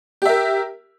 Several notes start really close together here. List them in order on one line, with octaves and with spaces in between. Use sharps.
G4 E5 A#4